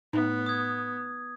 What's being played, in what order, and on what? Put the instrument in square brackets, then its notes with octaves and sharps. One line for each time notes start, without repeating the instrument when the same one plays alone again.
[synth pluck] A2 [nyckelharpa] B3 [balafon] D#4
[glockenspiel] D#6 G#6